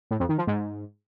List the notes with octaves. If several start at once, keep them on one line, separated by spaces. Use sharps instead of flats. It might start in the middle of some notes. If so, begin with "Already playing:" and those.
A2
F2
D#3
F3
G#2